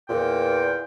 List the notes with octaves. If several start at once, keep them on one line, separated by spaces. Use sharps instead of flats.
E2 A#2 G5